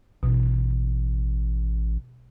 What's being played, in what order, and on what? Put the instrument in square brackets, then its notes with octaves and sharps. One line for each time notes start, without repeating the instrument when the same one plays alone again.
[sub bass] A1 [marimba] B2